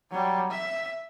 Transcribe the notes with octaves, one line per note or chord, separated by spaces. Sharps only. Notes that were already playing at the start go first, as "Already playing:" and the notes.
F#3 G3
E5